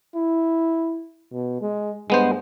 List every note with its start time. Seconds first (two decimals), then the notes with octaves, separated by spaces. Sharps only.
0.15 E4
1.32 B2
1.61 G#3
2.10 G2 G#3 B3 C5